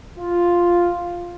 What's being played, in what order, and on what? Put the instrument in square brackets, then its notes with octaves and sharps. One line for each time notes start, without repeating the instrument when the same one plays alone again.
[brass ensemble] F4